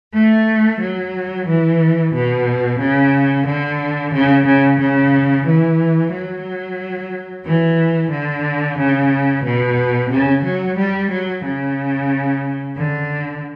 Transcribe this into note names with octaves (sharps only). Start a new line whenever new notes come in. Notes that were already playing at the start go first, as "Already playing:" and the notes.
A3
F#3
E3
B2
C#3
D3
C#3
C#3
C#3
E3
F#3
E3
D3
C#3
B2
C#3
F#3
G3
F#3
C#3
D3